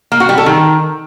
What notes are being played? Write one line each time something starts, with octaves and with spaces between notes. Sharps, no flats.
A#3
F#4
G3
A4
D#3